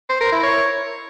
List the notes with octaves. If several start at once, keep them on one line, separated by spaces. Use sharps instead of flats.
C5
A#4
E4
C#5